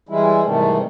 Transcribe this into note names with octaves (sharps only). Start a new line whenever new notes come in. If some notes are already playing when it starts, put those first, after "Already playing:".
E3 G3 G#3 E4
G#2 C3 D#3 E3 G3 A3